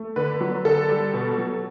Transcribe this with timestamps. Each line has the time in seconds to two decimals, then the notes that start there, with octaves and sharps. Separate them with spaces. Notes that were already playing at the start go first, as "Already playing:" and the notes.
Already playing: A3
0.16 D3 B4
0.41 F#3
0.65 D3 A4
0.89 G3
1.13 B2
1.38 F#3